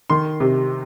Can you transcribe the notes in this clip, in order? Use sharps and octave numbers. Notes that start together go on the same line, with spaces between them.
D#3 C6
C3